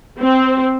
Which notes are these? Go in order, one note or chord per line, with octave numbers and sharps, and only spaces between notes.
C4